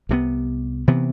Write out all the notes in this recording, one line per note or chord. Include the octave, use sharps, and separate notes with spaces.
C2 C3 E3 B3
C3 E3 B3